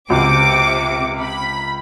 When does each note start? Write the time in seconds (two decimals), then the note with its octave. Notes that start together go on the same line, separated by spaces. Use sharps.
0.10 C#2 C3 D6
1.20 B5